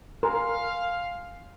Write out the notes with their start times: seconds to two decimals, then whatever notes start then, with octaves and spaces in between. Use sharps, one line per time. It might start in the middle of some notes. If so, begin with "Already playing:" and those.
0.23 A#4 F5 G#5 C6